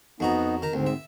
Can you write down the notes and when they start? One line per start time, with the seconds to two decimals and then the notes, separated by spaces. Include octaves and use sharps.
0.20 F2 B3 D#4 F#4 A#5
0.62 D#3 A#5
0.73 D2 G#2 C4
0.87 E5